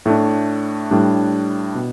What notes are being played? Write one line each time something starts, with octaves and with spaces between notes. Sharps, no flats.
A2 A3 D4
A2 G3 D4
B2